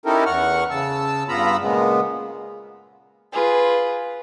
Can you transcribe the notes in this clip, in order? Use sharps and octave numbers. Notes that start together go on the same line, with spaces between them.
C#4 D#4 E4 G4 A4 A#4
E2 F#5 C#6 F6
C#3 A5 E6
G2 B3 F4 A#5 B5 E6
A#2 C#3 G#3 B3
F4 G#4 B4